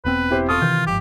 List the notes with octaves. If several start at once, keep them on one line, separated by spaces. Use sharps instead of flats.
E1 B3 C4 B4
E4 G4 C5
F4 A4 C#6 D#6
C3 D#3 E3 G6
G1 G#2 F3 G4